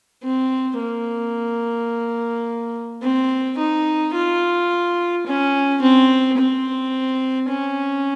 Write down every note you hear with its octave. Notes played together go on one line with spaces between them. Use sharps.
C4
A#3
C4
D#4
F4
C#4
C4
C4
C#4